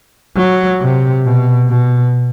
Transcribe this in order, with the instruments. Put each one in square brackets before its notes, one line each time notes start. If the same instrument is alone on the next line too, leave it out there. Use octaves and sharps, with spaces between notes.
[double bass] F#3
C3
B2
B2